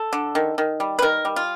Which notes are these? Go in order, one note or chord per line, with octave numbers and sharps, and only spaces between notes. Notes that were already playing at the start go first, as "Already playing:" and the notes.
Already playing: A4
D3
D#3
D#3
G3
B4
D#3 A#4
G3
F4